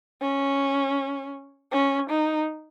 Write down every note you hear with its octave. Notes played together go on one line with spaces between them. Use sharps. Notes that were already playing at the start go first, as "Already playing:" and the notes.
C#4
C#4
D#4